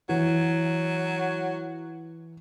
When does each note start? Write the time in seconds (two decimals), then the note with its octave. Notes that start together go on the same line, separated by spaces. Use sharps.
0.09 E3 F#3